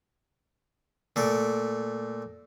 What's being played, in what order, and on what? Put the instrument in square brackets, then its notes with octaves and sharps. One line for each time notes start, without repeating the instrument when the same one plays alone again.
[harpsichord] A#2 A3 D6